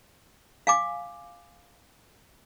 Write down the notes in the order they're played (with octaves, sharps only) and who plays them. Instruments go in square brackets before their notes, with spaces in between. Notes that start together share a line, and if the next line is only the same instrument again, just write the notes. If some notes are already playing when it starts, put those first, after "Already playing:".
[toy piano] F5 G#5 D6